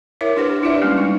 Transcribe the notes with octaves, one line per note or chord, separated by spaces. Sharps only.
E4 A#4 C#5 E5
D4 E4 G4 B4 C5 F#5
G4
D4 E4 F4 G4 D5 E5
G3 G#3 A#3 C#4
D#4